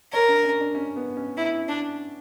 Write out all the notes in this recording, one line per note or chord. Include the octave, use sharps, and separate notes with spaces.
A#4 C#5
D4
C#4
D4
C#4
B3
C#4
E4
D4